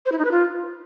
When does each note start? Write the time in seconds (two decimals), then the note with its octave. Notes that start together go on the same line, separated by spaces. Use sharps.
0.06 C5
0.12 E4
0.18 D#4
0.25 B4
0.31 F4